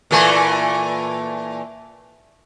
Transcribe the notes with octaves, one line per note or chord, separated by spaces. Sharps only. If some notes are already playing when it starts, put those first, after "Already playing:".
A#2 E3 A3